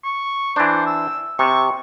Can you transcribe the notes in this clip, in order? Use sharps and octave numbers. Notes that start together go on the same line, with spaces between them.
C#6
E3 D4 C5
E6
C3 C#6